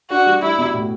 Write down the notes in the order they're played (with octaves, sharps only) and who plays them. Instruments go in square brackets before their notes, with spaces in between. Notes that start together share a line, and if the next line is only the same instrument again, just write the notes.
[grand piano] D4 [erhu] F#4
[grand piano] G3
[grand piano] G3 [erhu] E4
[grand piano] B2
A2